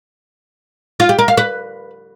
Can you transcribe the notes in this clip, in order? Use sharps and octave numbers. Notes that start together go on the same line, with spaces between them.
F4
G4
A#4
F5
B4